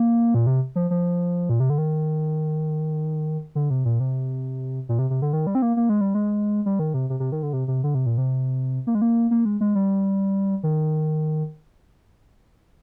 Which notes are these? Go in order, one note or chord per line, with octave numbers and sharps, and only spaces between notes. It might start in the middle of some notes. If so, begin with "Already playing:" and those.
Already playing: A#3
A#2
C3
F3
F3
A#2
C3
D3
D#3
D3
C3
A#2
C3
A#2
C3
C3
D3
D#3
G3
C4
A#3
A#3
G#3
G3
G#3
G3
D#3
C3
C3
C3
D#3
D3
C3
C3
D3
C3
A#2
C3
A#3
G#3
A#3
A#3
G#3
G#3
G3
D#3